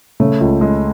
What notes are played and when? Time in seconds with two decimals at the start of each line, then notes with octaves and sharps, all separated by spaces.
0.20 C#3 A3
0.41 C#2
0.61 G#3